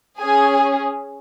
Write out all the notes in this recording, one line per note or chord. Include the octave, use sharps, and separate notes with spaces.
C#4 G#4 G#5